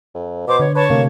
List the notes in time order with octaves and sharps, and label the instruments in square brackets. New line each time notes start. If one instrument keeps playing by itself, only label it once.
[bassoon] F2
[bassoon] B2 [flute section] C5 D6
[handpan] D3 [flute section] C#5
[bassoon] B4 [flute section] C#5 A5 C#6
[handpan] C3 A3 C4 [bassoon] A#3